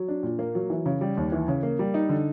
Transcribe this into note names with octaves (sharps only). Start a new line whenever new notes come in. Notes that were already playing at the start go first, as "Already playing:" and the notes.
Already playing: F#3
D4
A#2
A#3
F#3
E3
C#3
G3
D#2
E3
C#3
A#3
G3
D#4
D3